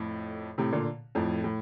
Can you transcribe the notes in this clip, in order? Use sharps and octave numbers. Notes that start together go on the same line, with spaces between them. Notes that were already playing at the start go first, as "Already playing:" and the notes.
Already playing: F2 A2
A2 C3
A#2 D3
F2 A2
A2